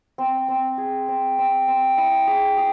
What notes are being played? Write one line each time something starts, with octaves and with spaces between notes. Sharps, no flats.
C4
C4
G#4
C4
C4
C4
E4
G#4
G#4